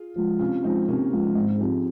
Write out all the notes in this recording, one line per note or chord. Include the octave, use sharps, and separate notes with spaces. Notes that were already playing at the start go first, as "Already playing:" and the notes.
Already playing: F4 G#4
F3 G#3
C3 C#4 F4
F3 G#3 C4 D#4
C3 A#3 C#4
F3 G#3
G#2 C4 D#4
G#4
F3 C4 D#4 G4